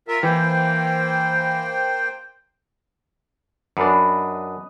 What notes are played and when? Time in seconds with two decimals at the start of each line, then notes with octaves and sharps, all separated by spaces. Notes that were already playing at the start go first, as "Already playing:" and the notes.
0.08 F4 A#4 E5
0.23 E3 A#3 C5 G5
3.77 F#2 D4 B4 D#5